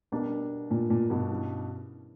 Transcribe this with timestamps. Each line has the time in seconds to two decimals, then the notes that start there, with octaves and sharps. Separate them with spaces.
0.12 B2 G3 B3 D4 A#4
0.71 A#2
0.90 A#2
1.10 G2 B2
1.30 E3 G3 C#4 E4